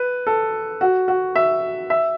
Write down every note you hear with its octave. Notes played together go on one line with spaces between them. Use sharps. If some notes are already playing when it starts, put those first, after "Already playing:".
Already playing: B4
A4
F#4
F#4
E5
E5